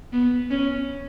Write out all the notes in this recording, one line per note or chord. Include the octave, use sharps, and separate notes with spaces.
B3
C#4